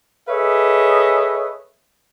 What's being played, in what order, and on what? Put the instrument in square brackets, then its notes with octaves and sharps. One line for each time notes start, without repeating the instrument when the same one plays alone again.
[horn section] G#4 A4 B4 C#5 D#5 E5